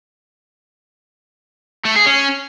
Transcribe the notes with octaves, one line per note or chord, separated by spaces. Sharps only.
A3
G#4
C#4